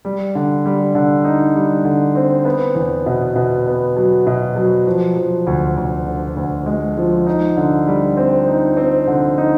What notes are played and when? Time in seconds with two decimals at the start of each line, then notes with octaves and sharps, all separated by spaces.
0.05 G3
0.35 D3
0.66 G3
0.95 D3
1.25 D#4
1.56 G3
1.85 D3
2.15 C4
2.45 B3
2.75 E2
3.06 B2
3.36 B2
3.67 B3
3.97 F#3
4.27 B2
4.56 F#3
4.87 F3
5.17 F3
5.47 D2
5.77 D2
6.06 D3
6.36 D2
6.66 G#3
6.97 F3
7.26 D#4
7.57 D3
7.87 G3
8.17 C4
8.48 D#4
8.77 C4
9.07 D3
9.38 D#4